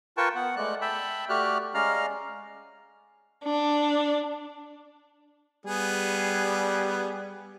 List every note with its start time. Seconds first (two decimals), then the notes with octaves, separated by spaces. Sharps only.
0.17 F4 A#4 B4 G5 A5 C#6
0.35 B3 F#5
0.56 G#3 A3 D5 F#6
0.81 E5 G5 A5 B5
1.29 A3 F#4 G4 D5 F6 F#6
1.74 G#3 C#4 D5 F5 A#5 F6
3.44 D4
5.65 G3 B3 G#4